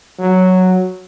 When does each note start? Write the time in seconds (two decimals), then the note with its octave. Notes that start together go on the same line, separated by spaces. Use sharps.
0.19 F#3